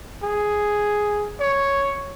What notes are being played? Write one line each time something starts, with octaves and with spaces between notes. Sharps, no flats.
G#4
C#5